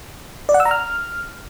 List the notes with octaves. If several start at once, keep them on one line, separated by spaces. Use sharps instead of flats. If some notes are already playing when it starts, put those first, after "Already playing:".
D5
F#5
E6
A#5
F6